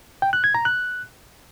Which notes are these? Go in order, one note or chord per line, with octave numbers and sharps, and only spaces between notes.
G5
F#6
G#6
A#5
F#6